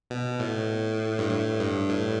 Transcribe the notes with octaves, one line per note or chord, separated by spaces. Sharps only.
B2
A2
G2
A2
G2
A2